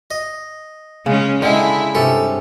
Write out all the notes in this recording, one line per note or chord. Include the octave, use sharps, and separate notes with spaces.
D#5
C#3 G#3 C#4
D3 G#3 E4 G5
G2 C3 C#4 A4